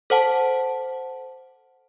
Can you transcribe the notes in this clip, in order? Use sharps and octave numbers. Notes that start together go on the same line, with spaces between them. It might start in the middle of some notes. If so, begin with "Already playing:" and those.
A4 C5 F#5 A5